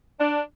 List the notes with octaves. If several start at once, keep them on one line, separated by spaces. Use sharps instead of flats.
D4